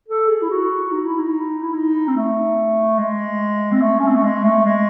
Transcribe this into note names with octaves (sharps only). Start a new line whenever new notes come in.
A4
G#4
E4
F#4
D#4
E4
D#4
E4
D#4
C4
A3
G#3
C4
A3
C#4
C4
A3
G#3
A3
G#3